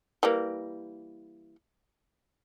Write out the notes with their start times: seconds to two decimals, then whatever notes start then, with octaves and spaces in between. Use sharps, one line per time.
0.23 E3 G3 A#3